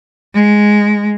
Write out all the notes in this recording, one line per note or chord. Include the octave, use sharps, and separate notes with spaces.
G#3